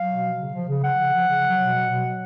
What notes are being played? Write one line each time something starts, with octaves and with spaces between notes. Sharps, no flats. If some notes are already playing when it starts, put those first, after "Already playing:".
Already playing: F#3 F5
B2
F3
C#3
F3
C#3
F3 F#5
C#3
F3
C#3
F#3
B2
F#3
B2
F#3